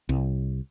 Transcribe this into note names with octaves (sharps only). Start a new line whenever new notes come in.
C2